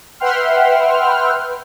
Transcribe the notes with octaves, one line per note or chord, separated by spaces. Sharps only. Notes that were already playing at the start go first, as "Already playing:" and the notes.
B4 E5 F#5 G5 C6 F6